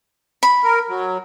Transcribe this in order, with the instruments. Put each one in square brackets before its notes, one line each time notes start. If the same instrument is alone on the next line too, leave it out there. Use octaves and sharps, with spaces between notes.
[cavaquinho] B5
[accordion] A#4
F#3